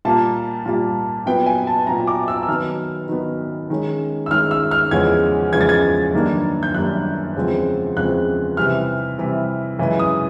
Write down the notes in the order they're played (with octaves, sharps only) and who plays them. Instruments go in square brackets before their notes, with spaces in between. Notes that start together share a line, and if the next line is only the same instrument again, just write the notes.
[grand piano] A#2 G3 A#3 A5
A#2 G3 A#3
A#2 F#3 B3 G5
G#5
A5
A#2 F#3 B3 A#5
D6
E6
E6
D#3 F#3 B3 F6
D#3 F#3 B3
D#3 G#3 C#4
E6
D#3 G#3 C#4 F6
E6
F6
E2 C#3 F3 G#3 C#4 G#6
E2 C#3 F3 G#3 C#4 G#6
A6
G#6
F#2 D#3 G3 A#3 D4
G6
F#2 D#3 G3 A#3 D4 F#6
E2 C#3 F3 G#3 C4
E2 C#3 F3 G#3 C4 F#6
C3 E3 G3 F6
C3 E3 G3
F#2 C#3 E3 G#3
D#6